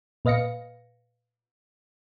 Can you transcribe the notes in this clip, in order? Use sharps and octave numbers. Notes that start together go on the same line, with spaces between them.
A#2 B4 D#5 F5 A#6 C#7